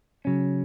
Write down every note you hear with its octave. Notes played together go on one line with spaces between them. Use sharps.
C#3 F#3 C#4